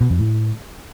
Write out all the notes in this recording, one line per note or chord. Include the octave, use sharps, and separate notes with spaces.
B2
F2
A2